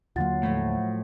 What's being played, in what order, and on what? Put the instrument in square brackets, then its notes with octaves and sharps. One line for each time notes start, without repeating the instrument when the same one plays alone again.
[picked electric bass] D#2 D3 A#3 [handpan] F#3 F4 [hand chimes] F#5 A6
[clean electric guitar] A2 [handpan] F3 A3